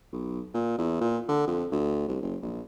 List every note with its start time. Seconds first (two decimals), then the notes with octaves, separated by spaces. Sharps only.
0.13 B1
0.54 A#2
0.78 E2
1.01 A#2
1.28 D3
1.47 F2
1.72 D2
2.08 C2
2.22 F#1
2.42 A#1